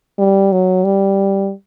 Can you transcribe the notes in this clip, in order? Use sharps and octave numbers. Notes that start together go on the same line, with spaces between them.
G3
F#3
G3